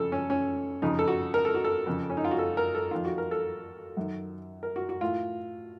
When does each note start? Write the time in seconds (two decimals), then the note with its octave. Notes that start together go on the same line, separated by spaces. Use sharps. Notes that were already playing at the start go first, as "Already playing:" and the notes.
Already playing: F2 C#3 A4
0.12 C#4
0.30 C#4
0.82 F2 C#3 D#4
0.99 A4
1.08 F#4
1.34 A#4
1.45 A4
1.54 F#4
1.65 A4
1.86 F2 C#3
2.10 C#4
2.17 D#4
2.24 F4
2.31 F#4
2.39 A4
2.57 A#4
2.75 A4
2.91 F2 D#3 F4
3.05 F#4
3.18 A#4
3.31 A4
3.97 F#2 D#3
4.63 A#4
4.76 F#4
4.89 F#4
5.01 A2 F4